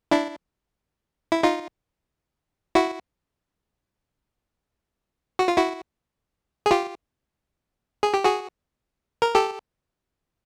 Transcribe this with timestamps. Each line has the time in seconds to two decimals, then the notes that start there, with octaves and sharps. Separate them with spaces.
0.11 D4 E4
1.32 E4
1.43 D#4 F4
2.75 E4 F#4
5.39 F#4
5.48 F4
5.57 E4 F#4
6.66 G#4
6.71 F4 G4
8.03 G#4
8.14 G4
8.24 F#4 G#4
9.22 A#4
9.35 G4 A4